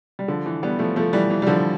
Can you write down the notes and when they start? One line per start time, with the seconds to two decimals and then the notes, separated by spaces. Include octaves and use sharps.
0.19 G3
0.28 D3 F3
0.46 E3
0.63 G3 B3
0.79 F3 A3
0.96 F3 A3
1.13 E3 G3
1.30 E3
1.42 G3
1.47 D3 F3